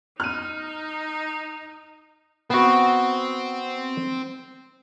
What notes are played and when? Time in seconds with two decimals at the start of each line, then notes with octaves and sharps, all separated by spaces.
0.20 D#4 F6 D#7
2.50 B3 C4 F#4